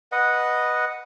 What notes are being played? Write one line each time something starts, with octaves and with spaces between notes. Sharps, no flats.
B4 D#5 F#5